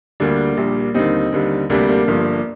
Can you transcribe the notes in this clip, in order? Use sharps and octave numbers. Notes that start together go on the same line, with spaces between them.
D2 D3 G3 A#3 D4
A#1 A#2 G3
D#2 D3 G3 C4 D#4
D#2 D3 G3
D2 C3 G3 A#3 D4
A#3 D4
G1 G2 F3